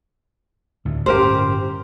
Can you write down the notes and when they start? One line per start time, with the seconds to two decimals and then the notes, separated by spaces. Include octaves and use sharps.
0.85 D2 A2
1.06 G1 A2 C#4 G4 A#4 C5